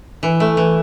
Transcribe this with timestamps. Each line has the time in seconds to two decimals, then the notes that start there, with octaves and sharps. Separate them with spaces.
0.23 E3
0.40 A3
0.57 E3